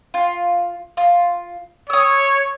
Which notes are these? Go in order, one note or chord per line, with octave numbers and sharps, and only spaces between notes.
F4
F4
C#5 D#6 E6